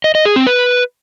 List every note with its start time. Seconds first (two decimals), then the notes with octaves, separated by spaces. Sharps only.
0.04 D#5
0.15 D#5
0.25 G#4
0.36 C4
0.47 B4